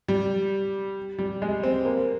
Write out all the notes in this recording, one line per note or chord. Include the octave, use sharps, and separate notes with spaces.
G3
G3
G#3
C4
A#3